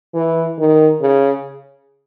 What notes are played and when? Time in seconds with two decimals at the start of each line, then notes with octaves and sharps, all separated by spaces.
0.14 E3
0.58 D#3
1.01 C#3